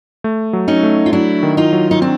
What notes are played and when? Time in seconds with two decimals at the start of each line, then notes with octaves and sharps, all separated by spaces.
0.24 A3
0.53 F#3
0.68 C#4 D#4
0.83 A3
1.06 F4
1.13 F#3 D4 E4
1.43 D#3
1.57 D#4 F4
1.73 F#3
1.91 D#4
2.02 C4 D4